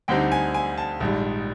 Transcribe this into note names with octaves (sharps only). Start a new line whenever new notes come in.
D2 D3 G3 C4 D#4 G5
G#5
G#5
A5
A#1 G#2 D#3 G3